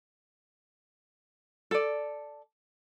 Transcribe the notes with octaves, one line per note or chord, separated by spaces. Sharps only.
A4 D5